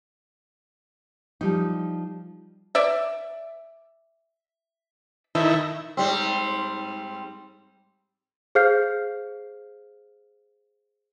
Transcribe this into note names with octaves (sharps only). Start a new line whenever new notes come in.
F3 G3 D#4
D5 E5
D#3 A3 E4
G#2 G3 C4
G#4 C5 F5 F6 G6 C7